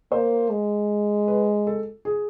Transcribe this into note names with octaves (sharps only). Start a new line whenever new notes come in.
A#3 C5
G#3
B4
A4
G#4